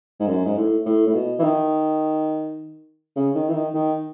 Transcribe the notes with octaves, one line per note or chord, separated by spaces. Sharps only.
G#2
F#2
G#2
A2
A2
A2
B2
E3
D#3
C#3
D#3
E3
D#3
D#3